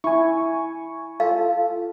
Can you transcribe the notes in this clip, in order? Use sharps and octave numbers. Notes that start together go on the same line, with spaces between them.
E4 G#5 C#6
F4 A4 F5